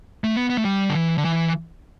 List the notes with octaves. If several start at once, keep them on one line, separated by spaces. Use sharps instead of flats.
A3
B3
B3
A3
G3
D3
E3
D3
E3